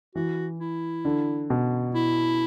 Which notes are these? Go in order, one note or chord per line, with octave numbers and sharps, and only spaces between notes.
E3 F#4
E4
D3
B2
E4